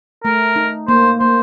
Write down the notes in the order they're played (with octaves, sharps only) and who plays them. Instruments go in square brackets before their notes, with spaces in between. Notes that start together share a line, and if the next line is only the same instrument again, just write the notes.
[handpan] A3 [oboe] A#4
[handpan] D#4
[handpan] A#3 [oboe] C5
[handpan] A#3 [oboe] C5